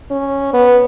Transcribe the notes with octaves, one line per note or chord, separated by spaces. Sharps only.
C#4
B3